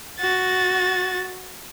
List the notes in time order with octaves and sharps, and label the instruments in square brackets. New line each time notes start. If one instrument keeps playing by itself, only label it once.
[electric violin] F#4 A6